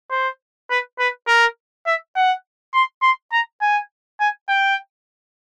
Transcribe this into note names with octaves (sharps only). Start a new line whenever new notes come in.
C5
B4
B4
A#4
E5
F#5
C6
C6
A#5
G#5
G#5
G5